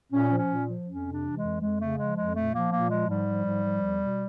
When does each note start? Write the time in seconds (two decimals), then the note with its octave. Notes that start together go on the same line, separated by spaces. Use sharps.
0.12 A#2 C#4
0.30 F3
0.37 C#4
0.49 A#2
0.68 F3
0.86 F2 C#4
1.04 C3
1.11 D4
1.23 E3
1.35 G#3
1.42 F2
1.59 F2 G#3
1.78 C#3 A3
1.97 F3 G#3
2.15 F2 G#3
2.34 A#2 A3
2.52 F3 A#3
2.71 A#2 A#3
2.90 F3 G#3
3.07 G#2 G3
3.27 F3
3.45 G#2
3.64 F3
3.82 E2
4.01 B2